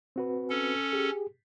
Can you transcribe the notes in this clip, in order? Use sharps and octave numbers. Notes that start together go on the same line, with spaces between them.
C4 F#4 B4
C#4 A4
G4 G#4